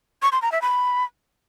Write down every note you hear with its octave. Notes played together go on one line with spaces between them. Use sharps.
C#6
C6
A#5
E5
B5